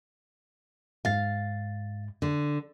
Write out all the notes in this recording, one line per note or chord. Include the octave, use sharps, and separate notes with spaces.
G#2 F5 A6
D3